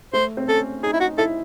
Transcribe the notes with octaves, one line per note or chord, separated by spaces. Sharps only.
A3 C5
C4
C#4 A4
D#4 G#4
E4
F#4
E4 A4